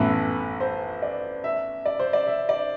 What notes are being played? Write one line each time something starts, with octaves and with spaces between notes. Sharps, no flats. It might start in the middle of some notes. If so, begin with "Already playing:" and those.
Already playing: A1 A2 E3 B3 B4
C5
D5
E5
D5
C5
D5
E5
D5